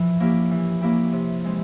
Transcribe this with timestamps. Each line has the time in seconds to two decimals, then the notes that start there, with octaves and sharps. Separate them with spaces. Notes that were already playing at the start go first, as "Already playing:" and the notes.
Already playing: E3 F3
0.20 A#3 C#4 E4 G4
0.51 E3
0.81 A#3 C#4 E4 G4
1.13 C3
1.45 E3 G#3 C4